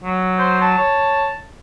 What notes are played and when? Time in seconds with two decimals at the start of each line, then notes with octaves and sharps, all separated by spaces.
0.04 F#3
0.38 C5
0.61 A5
0.77 C#5